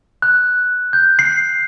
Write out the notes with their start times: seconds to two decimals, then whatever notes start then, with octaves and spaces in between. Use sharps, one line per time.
0.22 F#6
0.93 G6
1.19 C7